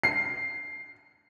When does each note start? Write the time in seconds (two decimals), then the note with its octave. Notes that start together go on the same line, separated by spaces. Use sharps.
0.03 C7